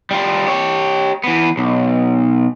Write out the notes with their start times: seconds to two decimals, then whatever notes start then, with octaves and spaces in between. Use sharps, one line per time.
0.11 G3 F4
0.48 G4 C#5
1.24 E3 B3
1.57 B1